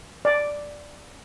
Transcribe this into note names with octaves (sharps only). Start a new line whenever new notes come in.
D5